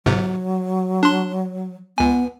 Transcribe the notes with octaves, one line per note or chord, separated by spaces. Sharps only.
G1 G#2 C3 F#3
D4 C6
C#2 B3 G#5